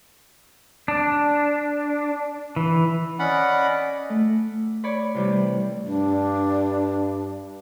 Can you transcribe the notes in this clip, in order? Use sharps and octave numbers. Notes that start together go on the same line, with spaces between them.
D4
E3
C#4 D5 D#5 F#5 B5
A3
C#5 D5 B5
C3 E3 G3
G2 D4